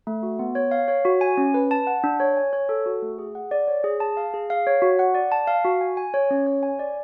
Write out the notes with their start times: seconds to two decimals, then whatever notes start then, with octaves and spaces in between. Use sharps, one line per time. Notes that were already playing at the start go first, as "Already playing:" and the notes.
0.07 A3
0.23 F#4
0.39 B3
0.55 C#5
0.71 F5
0.88 C#5
1.05 F#4
1.21 G#5
1.37 C#4
1.54 B4
1.71 A5
1.87 F#5
2.04 D4
2.20 C#5
2.37 G#5
2.53 C#5
2.69 A4
2.86 F#4
3.02 A3
3.19 G#4
3.35 F#5
3.51 D5
3.68 C#5
3.84 G#4
4.00 A5
4.17 F5
4.34 G#4
4.50 F5
4.67 C#5
4.82 F#4
4.99 F#5
5.15 D5
5.32 A5
5.47 F5
5.65 F#4
5.81 G#5
5.97 G#5
6.14 C#5
6.31 C#4
6.47 C#5
6.63 G#5
6.79 D5